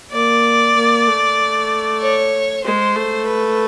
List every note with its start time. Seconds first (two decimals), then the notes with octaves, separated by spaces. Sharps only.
0.12 A#3 D5
0.75 A#3
1.07 A3
2.01 C#5
2.64 G#3 C5
2.96 A3
3.27 B4